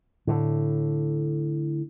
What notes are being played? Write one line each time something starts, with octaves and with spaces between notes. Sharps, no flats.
A2 D3